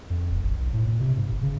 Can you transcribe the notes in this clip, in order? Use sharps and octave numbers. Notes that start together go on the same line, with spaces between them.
F2
E1
A1
B1
A2
A#2
C3
G#2
G1
C#3